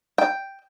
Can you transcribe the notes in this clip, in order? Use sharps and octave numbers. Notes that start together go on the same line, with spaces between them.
G5